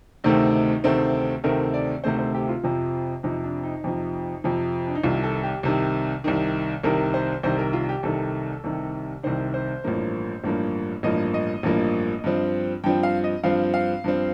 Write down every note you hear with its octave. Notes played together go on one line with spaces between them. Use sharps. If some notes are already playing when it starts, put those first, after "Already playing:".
D2 C3 D#3 A3 C4 D#4
D2 C3 D#3 A3 C4
D2 C3 D#3 A3 C4 A#4
D5
D2 C3 D#3 A3 C4 C5
C5
G4
F4
F2 C3 F3
F2 C3 F3 D#4
D4
D#4
F2 C3 F3
F2 C3 F3
D4
D#4
C2 C3 D#3 F4
A4
G4
C2 C3 D#3
C2 C3 D#3
C2 C3 D#3 A#4
C5
C2 C3 D#3 C5
A#4
F4
G4
C2 C3 D#3 A4
C2 C3 D#3
C2 C3 D#3 C5
C5
A1 G2 F3 A#3
A1 G2 F3 A#3
A1 G2 F3 A#3 D#5
D#5
A1 G2 F3 A#3
G2 F3 C4
G2 F3 C4 G5
F5
D#5
G2 F3 C4 F5
F5
G2 F3 C4